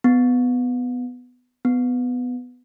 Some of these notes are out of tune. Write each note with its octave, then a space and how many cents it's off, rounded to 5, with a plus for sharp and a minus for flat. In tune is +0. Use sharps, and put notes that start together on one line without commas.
B3 +10
B3 +10